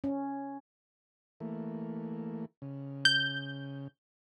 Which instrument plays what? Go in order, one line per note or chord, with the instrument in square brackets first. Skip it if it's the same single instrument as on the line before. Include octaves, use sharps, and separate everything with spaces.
[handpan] C#4
[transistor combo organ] E3 A3 A#3
C#3
[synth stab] G6